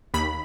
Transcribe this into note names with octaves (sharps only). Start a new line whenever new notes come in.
D#2 B5